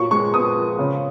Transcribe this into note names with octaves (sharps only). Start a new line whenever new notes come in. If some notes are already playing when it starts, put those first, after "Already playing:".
Already playing: A#2 F#3 C#6
G#3 C#6
B3 D#6
F3
C#3